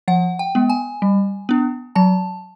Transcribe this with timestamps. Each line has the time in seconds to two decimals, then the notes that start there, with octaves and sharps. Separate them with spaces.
0.08 F3 F#5
0.39 G5
0.55 G#3 B3
0.70 G#5
1.02 G3
1.49 B3 D4
1.95 F#3 A5